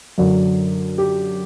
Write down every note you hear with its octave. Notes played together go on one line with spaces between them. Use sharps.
F#2 D3 F#3
G4